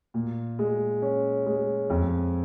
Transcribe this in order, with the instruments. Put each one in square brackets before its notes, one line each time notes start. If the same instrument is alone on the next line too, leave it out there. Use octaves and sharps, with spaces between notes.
[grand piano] A#2
G#3
C#4
G#3
F2